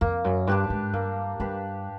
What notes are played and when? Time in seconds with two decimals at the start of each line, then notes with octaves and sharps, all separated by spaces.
0.01 F2 A#3
0.24 F#2
0.47 G2 D4 G4 B4
0.70 G#2
0.93 G2 A#3
1.40 G2 D4 G4 B4